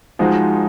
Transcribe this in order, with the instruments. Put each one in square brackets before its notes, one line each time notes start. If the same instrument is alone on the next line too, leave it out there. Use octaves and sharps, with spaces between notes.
[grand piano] F3 G#3 D#4 F#4 C5